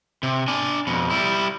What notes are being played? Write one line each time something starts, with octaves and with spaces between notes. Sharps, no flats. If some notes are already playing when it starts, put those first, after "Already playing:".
C3
D4 G#5
F2 B2
G3 E4